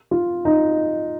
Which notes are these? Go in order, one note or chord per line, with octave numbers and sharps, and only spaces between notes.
F4
D#4